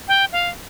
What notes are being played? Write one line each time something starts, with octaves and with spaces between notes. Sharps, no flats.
G5
F5